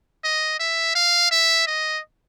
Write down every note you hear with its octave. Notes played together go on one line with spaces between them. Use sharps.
D#5
E5
F5
E5
D#5